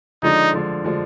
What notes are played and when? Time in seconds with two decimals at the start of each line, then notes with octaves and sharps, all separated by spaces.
0.23 D3 F3 G#3 D4 D#4
0.53 D3 F3 G#3 D4
0.85 D3 F3 G#3 D4